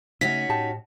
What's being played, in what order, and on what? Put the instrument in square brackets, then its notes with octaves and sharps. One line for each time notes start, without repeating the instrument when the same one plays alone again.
[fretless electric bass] C#3 A3 [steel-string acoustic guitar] C#4 D#4 F#4 [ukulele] E5 F#5 [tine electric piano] B6
[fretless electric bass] A2 [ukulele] G4 D#5 A5